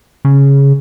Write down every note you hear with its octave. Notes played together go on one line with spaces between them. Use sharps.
C#3